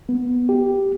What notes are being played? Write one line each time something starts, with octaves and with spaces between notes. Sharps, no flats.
B3
G4